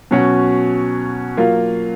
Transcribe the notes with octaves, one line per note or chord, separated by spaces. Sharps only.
B2 F#3 C#4 F#4
F#3 A#3 F4